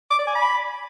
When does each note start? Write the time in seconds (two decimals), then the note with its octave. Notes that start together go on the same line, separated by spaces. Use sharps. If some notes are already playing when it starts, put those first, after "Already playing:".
0.11 D6
0.19 D5
0.27 G#5
0.35 B5